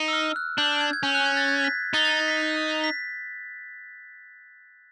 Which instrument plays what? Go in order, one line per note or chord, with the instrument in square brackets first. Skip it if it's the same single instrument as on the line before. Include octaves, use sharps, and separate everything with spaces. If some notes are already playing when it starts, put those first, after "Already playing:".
Already playing: [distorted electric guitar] D#4
[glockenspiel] E6
F6
F#6
[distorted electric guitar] D4 [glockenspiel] G6
[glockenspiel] G#6
G#6
[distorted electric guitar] C#4 [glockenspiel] G6
[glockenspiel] F#6
G#6
A6
G#6
B6
[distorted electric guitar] D#4 [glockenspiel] A6
[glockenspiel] A6
A6
B6
B6